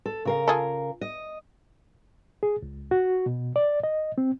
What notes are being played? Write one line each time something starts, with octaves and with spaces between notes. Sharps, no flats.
A4
C#3 A#4 F5
F4 G#4 A4
D#5
G#4
C#2
F#4
B2
D5
D#5
C4